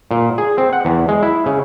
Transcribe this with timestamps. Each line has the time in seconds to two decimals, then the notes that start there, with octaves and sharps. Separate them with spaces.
0.11 A#2
0.38 G#4
0.58 C4
0.73 F#5
0.85 E2
1.08 G#3
1.23 E4
1.46 C#3